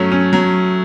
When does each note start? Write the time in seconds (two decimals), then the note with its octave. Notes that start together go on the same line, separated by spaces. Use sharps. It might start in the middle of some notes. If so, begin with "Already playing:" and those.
Already playing: F#3 A3 C#4
0.12 C#4
0.33 F#3